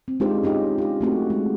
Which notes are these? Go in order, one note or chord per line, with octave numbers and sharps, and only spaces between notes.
C4
G#3 D4 D#4 F4 G4 C5
C#4 D#4 F4 G4 D#5
F4 G4
A3 C4 F#4
G#3